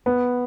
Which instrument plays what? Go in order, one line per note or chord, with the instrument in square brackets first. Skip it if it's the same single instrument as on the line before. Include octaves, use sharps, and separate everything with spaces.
[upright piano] B3